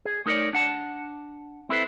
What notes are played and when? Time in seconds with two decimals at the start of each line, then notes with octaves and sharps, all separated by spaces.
0.05 G#4
0.26 A3 D#4 A#4 B4 C#5 D5
0.53 D4 F#5 A5
1.69 C4 E4 A4 B4 C5